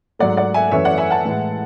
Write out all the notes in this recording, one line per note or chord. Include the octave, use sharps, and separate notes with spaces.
G#2 F#3 A3 D5 F#5
D5 F#5
E5 G#5
F#2 E3 A3 C#5 E5
D5 F#5
E5 G#5
F#5 A5
A2 E3 G#3